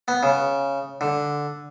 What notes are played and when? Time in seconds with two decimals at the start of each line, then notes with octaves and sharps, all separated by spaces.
0.08 B3
0.23 C#3
1.01 D3